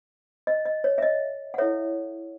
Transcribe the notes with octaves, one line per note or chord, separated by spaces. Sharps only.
D#5
D#5
C#5
E5
D#5
F#5
E4 A4 C#5 E5